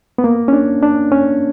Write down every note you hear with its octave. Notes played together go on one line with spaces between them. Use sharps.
B3
A#3
C#4
D4
D4
C#4